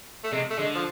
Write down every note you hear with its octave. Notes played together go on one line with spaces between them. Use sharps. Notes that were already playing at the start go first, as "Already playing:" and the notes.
A3
C3 G#3
A3
D3 G#3
F3